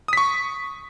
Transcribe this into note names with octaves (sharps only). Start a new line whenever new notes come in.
C#6 D#6 B6